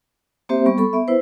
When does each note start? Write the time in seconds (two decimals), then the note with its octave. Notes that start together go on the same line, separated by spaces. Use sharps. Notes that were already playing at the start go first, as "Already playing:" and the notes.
0.49 A#3 C4 G4 C5 E5
0.66 G3 B3 C#6
0.78 A4 B5 C#6
0.93 B3 E5
1.08 E4 B4 C5